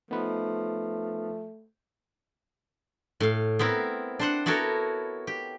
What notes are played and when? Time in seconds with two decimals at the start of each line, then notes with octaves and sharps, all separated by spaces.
0.11 F3 A3 B3 D#4 B4
3.20 A2 F5
3.59 B3 C4 E4 A#4
4.19 D4 C5 F#5
4.46 B3 E4 F#4 A4 A#4 C#5
5.27 G4